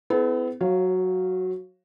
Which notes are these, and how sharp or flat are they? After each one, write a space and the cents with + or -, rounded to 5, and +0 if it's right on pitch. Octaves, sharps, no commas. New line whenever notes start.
B3 +40 E4 +0 A4 -35
F#3 +0 C#5 -35 F5 +0